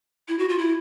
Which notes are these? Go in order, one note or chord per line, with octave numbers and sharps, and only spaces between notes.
E4
F#4
F4
E4